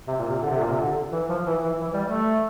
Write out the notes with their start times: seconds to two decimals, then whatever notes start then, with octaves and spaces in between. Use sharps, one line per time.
0.08 C3
0.19 A#2
0.31 C3
0.42 D3
0.51 C3
0.60 A#2
0.68 C3
0.77 D3
1.12 E3
1.30 F3
1.47 E3
1.64 E3
1.81 E3
1.94 G3
2.06 A3